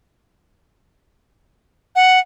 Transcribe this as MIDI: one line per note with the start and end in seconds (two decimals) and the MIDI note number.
1.96 2.19 78